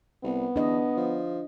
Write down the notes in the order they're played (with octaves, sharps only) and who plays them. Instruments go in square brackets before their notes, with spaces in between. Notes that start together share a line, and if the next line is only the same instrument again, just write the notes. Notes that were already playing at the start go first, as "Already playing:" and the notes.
[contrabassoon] C2 [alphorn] B3
[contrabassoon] E2 [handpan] D4 D#5
[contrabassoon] F3